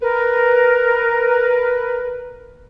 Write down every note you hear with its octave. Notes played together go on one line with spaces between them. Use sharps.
A#4 B4